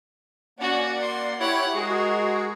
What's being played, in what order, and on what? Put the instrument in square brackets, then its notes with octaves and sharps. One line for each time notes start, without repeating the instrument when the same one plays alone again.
[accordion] A#3 D5 F#5 [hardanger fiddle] C#4 F#4
[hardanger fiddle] C6
[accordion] E4 C#5 [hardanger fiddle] G4 F#5
[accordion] G#3 F#4 G#4 [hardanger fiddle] A#4